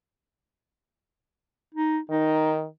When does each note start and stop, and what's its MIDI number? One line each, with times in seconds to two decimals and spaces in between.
1.74 1.99 63
2.10 2.65 51
2.10 2.53 63